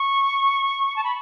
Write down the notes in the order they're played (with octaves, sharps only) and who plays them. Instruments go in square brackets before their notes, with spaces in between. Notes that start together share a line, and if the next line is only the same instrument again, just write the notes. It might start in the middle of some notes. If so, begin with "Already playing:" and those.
Already playing: [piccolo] C#6
A5
B5